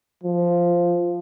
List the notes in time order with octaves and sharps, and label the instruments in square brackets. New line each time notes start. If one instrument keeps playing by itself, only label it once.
[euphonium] F3